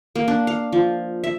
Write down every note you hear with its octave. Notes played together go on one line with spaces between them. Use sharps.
A#3
D4
F5
F3
E5